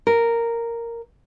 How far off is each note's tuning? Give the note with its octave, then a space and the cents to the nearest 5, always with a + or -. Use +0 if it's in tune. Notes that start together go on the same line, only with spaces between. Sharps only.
A#4 -5